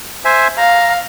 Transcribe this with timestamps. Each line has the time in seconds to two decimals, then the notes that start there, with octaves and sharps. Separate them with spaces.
0.25 C5 E5 G#5
0.58 F5 A#5